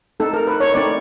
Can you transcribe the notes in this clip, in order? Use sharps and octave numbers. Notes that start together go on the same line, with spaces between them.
A3 C4 D#4 A4
A#4
B4
C#5
A3 C4 D#4 D5